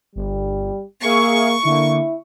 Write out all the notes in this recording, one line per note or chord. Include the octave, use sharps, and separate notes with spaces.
G1 G3
A#3 G#4 E5 F5 C#6
D3 A#3 E4